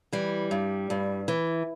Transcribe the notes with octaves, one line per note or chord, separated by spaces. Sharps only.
E3 G3
G2
G2
E3